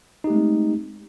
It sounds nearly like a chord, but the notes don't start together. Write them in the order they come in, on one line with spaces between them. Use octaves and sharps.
D#4 G4 A3 G#3 C4